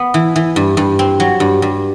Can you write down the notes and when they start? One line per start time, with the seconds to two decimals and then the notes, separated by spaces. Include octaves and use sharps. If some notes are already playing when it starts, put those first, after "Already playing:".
Already playing: B3
0.14 E3
0.36 E3
0.56 G2
0.77 G2
0.99 C4
1.20 F#3
1.40 G2
1.62 G2